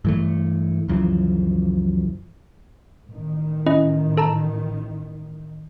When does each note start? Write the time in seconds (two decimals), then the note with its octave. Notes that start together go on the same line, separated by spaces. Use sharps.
0.05 G2 E3 A3
0.88 C#2 F#2 E3 F3
3.07 A1 D#3
3.66 C#4 E4 D#5
4.17 A4 A5 A#5